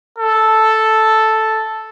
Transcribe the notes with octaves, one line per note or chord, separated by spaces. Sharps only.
A4